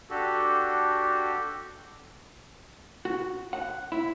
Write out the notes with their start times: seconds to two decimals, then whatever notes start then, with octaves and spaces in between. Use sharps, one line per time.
0.10 D4 F#4 G4 A4
3.05 F#4
3.53 F#5
3.92 E4